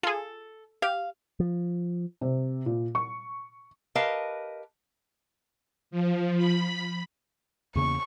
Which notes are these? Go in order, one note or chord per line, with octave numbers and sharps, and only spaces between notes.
F4 G#4 A4
G4 F5
F3
C3
A#2
C#6
G4 A#4 B4 D#5 F5 A5
F3
B5
E2 C#3 A#3 C#6